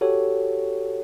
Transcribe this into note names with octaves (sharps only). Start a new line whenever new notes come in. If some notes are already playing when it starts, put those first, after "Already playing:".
F#4 G4 A4 C#5